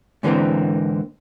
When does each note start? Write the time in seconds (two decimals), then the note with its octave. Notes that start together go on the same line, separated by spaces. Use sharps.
0.23 G#2 D3 E3 G3 A#3 C4